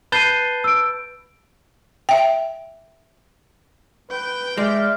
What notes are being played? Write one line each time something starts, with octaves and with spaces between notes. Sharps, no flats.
B4 A5 F#6 G6 C7 D#7
E6 D7
E5 G5
B4 G5
G#3 D5 E5 F6